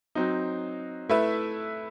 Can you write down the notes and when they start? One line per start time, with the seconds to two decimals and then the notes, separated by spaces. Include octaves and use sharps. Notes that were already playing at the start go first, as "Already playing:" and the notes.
0.15 F#3 C4 D#4
1.09 A3 E4 B4 E5